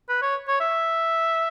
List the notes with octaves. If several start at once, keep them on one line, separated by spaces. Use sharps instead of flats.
B4
C#5
C#5
E5